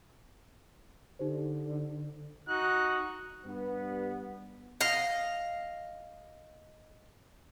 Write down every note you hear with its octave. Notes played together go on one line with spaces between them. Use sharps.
D3 D#4 G4 C5
D#4 F#4 F#6
G2 B3
D#5 F5